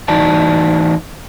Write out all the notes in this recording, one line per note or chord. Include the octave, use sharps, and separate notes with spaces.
E3 D#4 F#4 D5 A5